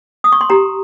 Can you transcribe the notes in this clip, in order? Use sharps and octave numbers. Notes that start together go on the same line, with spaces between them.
D#6
C#6
C6
G4 A#5